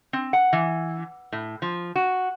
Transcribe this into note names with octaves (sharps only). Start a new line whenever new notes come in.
C4
F#5
E3
A2
F3
F#4